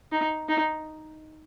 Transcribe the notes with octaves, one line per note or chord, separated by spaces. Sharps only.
D#4
D#4